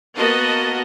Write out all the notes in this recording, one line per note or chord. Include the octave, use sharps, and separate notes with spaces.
A#3 B3 F#4 A#4 D#5 A5